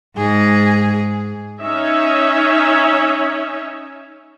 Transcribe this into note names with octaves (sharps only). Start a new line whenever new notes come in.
G#2 G#4
C#4 D#4 C#5 E5